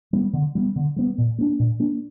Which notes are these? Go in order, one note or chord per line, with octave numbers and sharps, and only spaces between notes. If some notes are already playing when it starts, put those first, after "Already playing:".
G3 B3
D3
G3 B3
D3
G3 B3
A#2
A#3 D4
A#2
A#3 D4